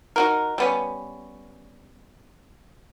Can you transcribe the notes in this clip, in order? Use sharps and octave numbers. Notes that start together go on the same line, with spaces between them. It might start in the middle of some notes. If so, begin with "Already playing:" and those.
D#4 F#4 A#4
G3 B3 C#4